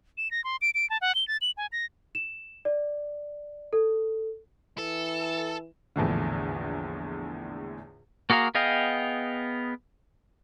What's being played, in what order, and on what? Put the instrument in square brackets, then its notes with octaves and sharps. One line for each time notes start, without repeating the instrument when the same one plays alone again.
[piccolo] E7
A#6
C6
D7
D7
A5
F#5
G7
A6
F#7
G#5
A#6
[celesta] E7
D5
A4
[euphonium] E3 [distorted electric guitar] A4
[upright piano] A#1 E2 A2 D3
[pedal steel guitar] A#3 F#4 G#4 A#4 F5
B3 G#4 D#5 F5 G5